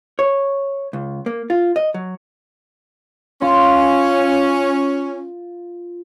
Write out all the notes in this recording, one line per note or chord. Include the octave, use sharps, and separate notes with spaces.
C#5
C#2
A#3
F4
D#5
F#3
C#4 F4